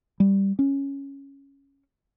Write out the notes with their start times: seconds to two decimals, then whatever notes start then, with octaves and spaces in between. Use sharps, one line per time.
0.20 G3
0.59 C#4